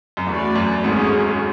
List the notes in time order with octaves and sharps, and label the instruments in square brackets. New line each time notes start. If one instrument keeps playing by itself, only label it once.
[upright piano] F#2
[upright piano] E2 [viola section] A3 C#4 F#4 B4 D5
[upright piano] F#2
[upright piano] G#1 G#2 [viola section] A3 C#4 G#4